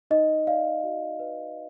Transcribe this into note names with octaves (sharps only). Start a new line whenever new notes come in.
D#4 D#5
D5 F5
F#4
B4